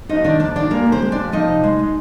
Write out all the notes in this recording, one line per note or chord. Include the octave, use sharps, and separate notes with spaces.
F2 D#4 D#5
D#3 D4 D5
F2 D4 D5
D#3 D4 D5
G#3 A#3 A#4
D3
C4 C5
G#3
D4 D5
F2
F3 D#4 D#5
C3
G#3
G#3